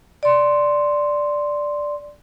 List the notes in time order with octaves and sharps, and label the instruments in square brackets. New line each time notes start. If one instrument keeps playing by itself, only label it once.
[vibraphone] D5 C6